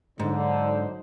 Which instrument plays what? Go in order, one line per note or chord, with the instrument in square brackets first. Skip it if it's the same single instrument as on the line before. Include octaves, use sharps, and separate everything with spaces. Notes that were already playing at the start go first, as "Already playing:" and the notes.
[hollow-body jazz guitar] G#2 [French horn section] D3 [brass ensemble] F#3 D#4 C5